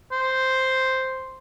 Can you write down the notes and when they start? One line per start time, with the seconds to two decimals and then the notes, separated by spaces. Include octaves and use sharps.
0.12 C5